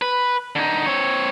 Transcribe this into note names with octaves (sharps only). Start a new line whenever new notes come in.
B4
D3 D#4
C4 C#5